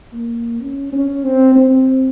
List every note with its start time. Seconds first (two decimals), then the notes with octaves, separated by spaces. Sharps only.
0.13 A#3
0.61 C#4
0.92 C#4
1.24 C4
1.56 C4